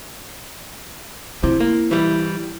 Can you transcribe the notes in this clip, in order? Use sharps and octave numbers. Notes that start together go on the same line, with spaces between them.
C3 E4
A#3
E3 G3